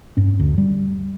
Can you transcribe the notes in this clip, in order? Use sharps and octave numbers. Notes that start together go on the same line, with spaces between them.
G2 C#4
D2
G3